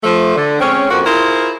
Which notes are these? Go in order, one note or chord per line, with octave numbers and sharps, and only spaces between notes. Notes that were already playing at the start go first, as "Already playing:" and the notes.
F3 A3
D3
G#3 C4 C#4
F2 A#3 F#4
E4 F4 G#4 A#4 C5